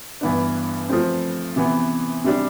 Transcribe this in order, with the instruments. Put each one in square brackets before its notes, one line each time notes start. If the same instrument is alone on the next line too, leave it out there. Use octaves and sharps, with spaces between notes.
[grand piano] G2 E3 B3 D4
F3 A3 C4
C3 E3 B3
C3 G3 D4